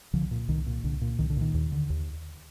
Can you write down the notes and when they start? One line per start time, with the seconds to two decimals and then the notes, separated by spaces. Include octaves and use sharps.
0.13 C2 D3 F3
0.31 A#2
0.49 C2 D#3
0.67 A#2
0.84 C2 D3
1.02 A#2
1.19 C2 D#3
1.30 D3
1.37 A#2 D#3
1.54 D#2
1.72 D3
1.90 D#2